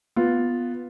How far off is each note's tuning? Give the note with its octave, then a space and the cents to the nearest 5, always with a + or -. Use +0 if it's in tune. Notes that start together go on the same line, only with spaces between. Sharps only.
B3 +0 F4 +0